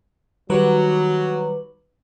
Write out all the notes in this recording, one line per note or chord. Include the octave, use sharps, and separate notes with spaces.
D#3 F#3 G3 B4